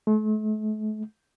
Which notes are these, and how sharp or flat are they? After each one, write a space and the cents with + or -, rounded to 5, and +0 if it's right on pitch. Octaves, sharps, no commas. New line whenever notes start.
A3 -40